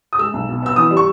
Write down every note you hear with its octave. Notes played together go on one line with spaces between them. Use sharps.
D#6
G#3 E6
B1
B2
B3 E6
E3 D#6
G3
C#6